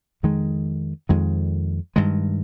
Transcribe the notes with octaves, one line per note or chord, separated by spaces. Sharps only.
F2 D#3 G#3
F2 D#3 G#3
G2 D#3 G#3